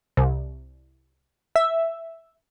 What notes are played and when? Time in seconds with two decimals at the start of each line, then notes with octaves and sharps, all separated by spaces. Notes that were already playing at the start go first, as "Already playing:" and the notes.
0.17 C2
1.56 E5